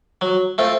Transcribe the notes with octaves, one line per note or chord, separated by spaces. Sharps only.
F#3
A3 C4 F4